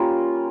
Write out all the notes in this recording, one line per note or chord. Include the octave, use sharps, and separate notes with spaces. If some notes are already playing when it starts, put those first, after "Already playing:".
Already playing: G3 A#3 C#4 F4 A#4